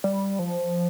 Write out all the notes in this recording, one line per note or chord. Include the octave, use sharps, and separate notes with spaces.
G3
F3